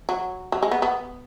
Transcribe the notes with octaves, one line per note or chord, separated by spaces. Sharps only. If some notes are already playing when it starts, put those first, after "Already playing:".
F#3
F#3
G#3
B3
B3